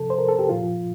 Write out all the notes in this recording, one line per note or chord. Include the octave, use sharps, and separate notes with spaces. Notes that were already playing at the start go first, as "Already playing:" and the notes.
Already playing: C3 F3 A4
C5
A#4
A4
G4
A#2 F3 F4